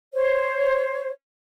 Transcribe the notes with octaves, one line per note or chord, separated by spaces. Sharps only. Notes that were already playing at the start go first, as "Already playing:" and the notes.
C5 C#5